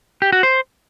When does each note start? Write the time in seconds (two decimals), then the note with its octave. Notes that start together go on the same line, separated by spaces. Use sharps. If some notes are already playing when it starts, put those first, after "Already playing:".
0.22 G4
0.32 F#4
0.43 C5